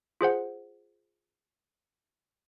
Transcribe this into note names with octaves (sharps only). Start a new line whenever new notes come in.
F4 G#4 C5 F#5